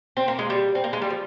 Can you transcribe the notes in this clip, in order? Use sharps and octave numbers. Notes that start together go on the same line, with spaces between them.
C4
A#3
G#3
G3
C4
A#3
G#3
G3
F3